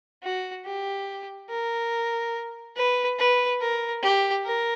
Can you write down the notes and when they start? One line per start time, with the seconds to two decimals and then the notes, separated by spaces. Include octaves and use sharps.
0.23 F#4
0.65 G4
1.50 A#4
2.76 B4
3.19 B4
3.61 A#4
4.03 G4
4.45 A#4